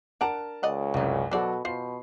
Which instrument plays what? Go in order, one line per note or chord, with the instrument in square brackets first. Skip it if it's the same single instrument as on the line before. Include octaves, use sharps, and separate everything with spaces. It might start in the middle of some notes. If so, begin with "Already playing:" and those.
[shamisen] D4 F#5 A#5 [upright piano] A#4 A5 D7
[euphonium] C#2 [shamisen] D5 D#5 F#5
[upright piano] C2 F#2 [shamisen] E3 D#4
[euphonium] B2 [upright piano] F#3 F#4 A4 [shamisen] C5 D5
[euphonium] B2 [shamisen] F4 C5 [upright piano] C7